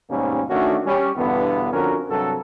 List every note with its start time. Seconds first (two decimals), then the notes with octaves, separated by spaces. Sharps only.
0.10 D#2 G#2 B2 G3 A#3 C#4
0.50 D#3 A3 C#4 D4 F#4
0.86 G3 C#4
1.16 E2 G2 B2 D3 B3
1.72 F2 D3 C#4 F#4 A#4
2.10 G2 C3 F#3 A4